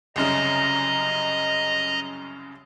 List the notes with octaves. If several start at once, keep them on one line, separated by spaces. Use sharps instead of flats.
C2 F#2 C#3 D#5 A#5